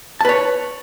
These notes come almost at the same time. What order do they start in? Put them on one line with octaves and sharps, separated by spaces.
A5 B4 C#5